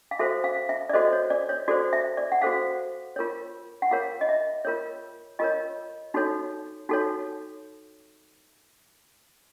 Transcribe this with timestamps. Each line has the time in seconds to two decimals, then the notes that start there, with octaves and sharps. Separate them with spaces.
0.11 F5
0.19 F#4 A4 C5 E5
0.44 F5
0.69 E5
0.89 D5
0.93 F#4 A4 C5 D#5
1.13 C#5
1.30 D5
1.49 C#5
1.68 F#4 A4 C5 D5
1.93 E5
2.17 D5
2.32 F#5
2.42 F#4 A4 C5 F5
3.16 F4 A#4 C#5
3.82 F#5
3.91 F4 A#4 C#5 F5
4.21 D#5
4.29 E5
4.65 F4 A#4 C#5
5.39 F4 A#4 C#5 D#5
6.14 D#4 F#4 A4 C#5
6.89 D#4 F#4 A4 C#5